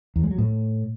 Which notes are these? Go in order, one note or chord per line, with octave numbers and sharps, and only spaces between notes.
E2
G#3
F#3
A2